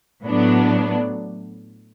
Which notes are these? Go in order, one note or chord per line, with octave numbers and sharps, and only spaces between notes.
A2 F#3 B3 D4